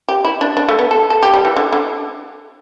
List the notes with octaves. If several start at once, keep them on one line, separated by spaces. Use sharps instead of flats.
G4
E4
D4
D4
A3
B3
A4
A4
G4
G3
E3
D3
D3